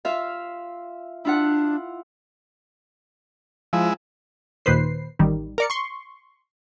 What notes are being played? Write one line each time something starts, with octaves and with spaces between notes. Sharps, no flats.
F4 E5 F5
D4 E4 F4 F#5
F3 G#3 E4
D#2 A#2 D#3 B4 C5 C7
A1 D#3 G3
A#4 D5 C#7
C6 C#6